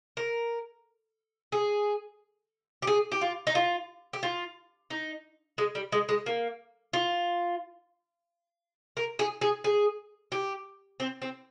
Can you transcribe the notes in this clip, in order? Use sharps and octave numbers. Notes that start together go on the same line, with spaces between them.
A#4
G#4
G4
G#4
G4
F4
D#4
F4
G4
F4
D#4
G#3
G3
G#3
G#3
A#3
F4
A#4
G#4
G#4
G#4
G4
C4
C4